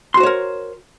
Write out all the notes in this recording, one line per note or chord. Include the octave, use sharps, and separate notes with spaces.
F#4 A#4 C5 C#5 C6